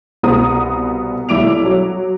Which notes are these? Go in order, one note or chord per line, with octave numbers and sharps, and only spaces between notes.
C2 B2 B3 C5 A#5 D#6
B1 G3 E4 D6 D7 F7
F#3